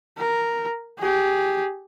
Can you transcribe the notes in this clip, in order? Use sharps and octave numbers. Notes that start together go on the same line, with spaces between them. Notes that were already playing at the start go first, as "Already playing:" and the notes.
A#4
G4 G#4